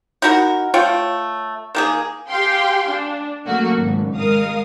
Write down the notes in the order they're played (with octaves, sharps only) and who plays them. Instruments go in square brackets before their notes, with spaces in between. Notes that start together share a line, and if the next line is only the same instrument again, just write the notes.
[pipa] D#4 E4 F#4 A#4
A3 F4 C#5 G5
D#3 A#3 G#4
[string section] G4 G#4 F5 G5 C6
D4
C#3 F#3 A3 A#3 F#4
G#1 C#2
G#3 A#4 F5 D#6